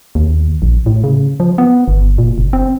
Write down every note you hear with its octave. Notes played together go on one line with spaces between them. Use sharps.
D#2
A#1
A2
C#3
F3
B3
G1
A#2
F#1
C4